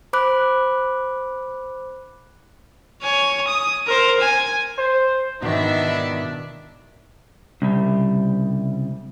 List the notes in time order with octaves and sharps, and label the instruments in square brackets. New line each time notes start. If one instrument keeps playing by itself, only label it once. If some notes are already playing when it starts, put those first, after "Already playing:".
[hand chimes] C5 B5 D6 F#6
[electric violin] C#5 G#5
D#6
A#4 C5
G#5
[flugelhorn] C5
[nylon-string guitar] G#2 B2 [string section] D#3 E4 E5 [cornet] D4
[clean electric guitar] C2 [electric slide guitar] C#3 G3